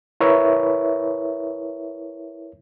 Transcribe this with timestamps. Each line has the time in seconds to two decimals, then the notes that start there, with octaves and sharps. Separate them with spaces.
0.20 E4 A#4 B4 C#5 E5